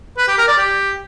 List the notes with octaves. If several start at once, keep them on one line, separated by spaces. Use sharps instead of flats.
B4
G4
A#4
D5
G4